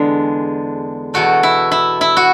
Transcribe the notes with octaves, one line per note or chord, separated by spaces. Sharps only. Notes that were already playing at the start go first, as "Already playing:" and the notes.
Already playing: E2 D3 G#3 D4 G#4
E2 B2 A3 F#4
E4
E4
E4
F#4